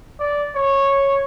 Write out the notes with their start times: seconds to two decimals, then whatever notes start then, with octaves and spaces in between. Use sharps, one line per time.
0.20 D5
0.55 C#5